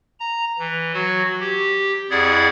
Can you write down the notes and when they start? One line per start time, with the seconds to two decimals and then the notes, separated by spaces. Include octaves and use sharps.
0.20 A#5
0.59 E3
0.94 F#3 F#4
1.40 G4
2.10 F2 E4 G#4 D5 F#5 G#6